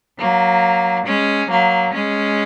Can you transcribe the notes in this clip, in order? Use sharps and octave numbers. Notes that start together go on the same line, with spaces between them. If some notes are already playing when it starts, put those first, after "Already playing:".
F#3 A#3
G#3 C#4
F#3 A#3
G#3 C#4